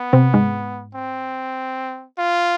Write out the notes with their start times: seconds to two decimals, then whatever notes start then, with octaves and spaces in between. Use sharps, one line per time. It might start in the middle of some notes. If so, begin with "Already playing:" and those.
Already playing: B3
0.13 C3 C4
0.34 G#2 G#3
0.95 C4
2.18 F4